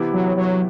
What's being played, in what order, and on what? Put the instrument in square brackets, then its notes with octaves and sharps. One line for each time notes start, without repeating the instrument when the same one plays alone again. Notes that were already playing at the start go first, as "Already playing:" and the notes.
Already playing: [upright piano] C3 E3 B3 E4 G4
[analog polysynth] F#3
F#3